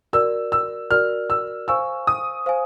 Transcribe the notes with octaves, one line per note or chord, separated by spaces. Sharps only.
F#4 A#4 D5 E6
E6
F#4 A#4 D5 F6
E6
C5 F5 G#5 C#6 E6
D#6
C5 F5 G#5